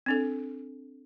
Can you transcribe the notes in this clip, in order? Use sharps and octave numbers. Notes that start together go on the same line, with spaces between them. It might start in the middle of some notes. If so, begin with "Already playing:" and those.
C4 D4 A4